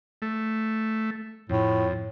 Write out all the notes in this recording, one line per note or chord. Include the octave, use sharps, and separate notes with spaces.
A3
F2 A2